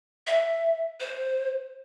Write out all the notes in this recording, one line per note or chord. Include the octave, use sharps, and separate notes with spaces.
E5
C5